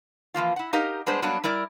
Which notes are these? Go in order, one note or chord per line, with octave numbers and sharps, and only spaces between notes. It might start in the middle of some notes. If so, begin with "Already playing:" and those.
E3 F3 A#3 F4
E4 F#5
D#4 G4 A#4 D#5 F5
G3 G#3 B3 D4 C5
F#3 G3 A#3 B3 D4
G3 E4 A#4 D5